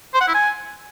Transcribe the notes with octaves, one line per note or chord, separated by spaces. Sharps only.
C5
F#5
E4
G#5